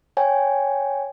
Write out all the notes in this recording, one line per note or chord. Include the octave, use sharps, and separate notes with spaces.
C#5 G5 G#5